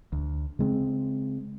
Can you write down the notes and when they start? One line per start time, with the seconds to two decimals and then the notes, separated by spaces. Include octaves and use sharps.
0.12 D2
0.59 C#3 G#3 C4